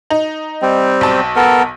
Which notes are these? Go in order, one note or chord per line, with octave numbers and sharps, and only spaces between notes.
D#4
G3 C4
B1 A5
B3 A4 A#4